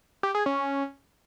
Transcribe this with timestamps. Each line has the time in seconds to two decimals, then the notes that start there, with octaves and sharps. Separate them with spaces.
0.23 G4
0.35 G#4
0.46 C#4